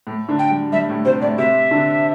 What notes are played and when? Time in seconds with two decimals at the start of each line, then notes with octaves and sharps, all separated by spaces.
0.07 A2 A3
0.29 D3 D4
0.39 G5
0.51 G3
0.72 G3 E5
0.89 A2 A3
1.05 C3 C4 C5
1.21 A2 A3 D5
1.38 C3 C4 E5
1.71 D3 D4